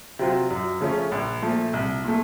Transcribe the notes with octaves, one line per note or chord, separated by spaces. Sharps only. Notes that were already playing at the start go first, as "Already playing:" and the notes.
C3 F#3 C4 F4
F#2
C#3 F3 A3 C#4
A#1
A#2 F3 A3
C2
A#2 A3